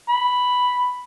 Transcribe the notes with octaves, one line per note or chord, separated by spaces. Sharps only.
B5